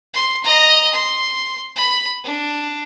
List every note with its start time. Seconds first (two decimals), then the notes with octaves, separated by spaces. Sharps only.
0.14 C6
0.44 D#5 A#5
0.93 C6
1.76 B5
2.24 D4